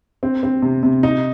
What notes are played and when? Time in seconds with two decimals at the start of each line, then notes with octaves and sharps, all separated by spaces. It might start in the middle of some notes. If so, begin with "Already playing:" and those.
0.23 C4
0.43 C4
0.62 C3
0.83 C3
1.03 D#4